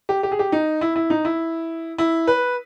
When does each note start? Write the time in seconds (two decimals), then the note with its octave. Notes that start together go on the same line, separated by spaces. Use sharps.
0.09 G4
0.23 G4
0.32 G#4
0.39 G4
0.52 D#4
0.81 E4
0.96 E4
1.10 D#4
1.25 E4
1.98 E4
2.27 B4